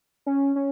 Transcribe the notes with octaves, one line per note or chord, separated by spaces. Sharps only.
C#4
C#4